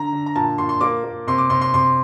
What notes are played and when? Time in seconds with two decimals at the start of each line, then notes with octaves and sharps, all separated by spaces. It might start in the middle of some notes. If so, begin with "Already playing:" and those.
Already playing: D3 A#5
0.12 D3
0.26 A#5
0.35 A#2 A5
0.58 A#2 C6
0.69 C6
0.81 A#3 D6
1.04 A#3
1.27 C3 C6
1.38 D6
1.50 C3 C6
1.61 C6
1.74 C3 C6